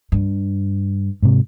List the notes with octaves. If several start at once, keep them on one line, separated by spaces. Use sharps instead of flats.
G2
G#2 C3